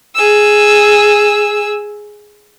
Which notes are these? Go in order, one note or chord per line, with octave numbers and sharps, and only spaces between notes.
G#4 E6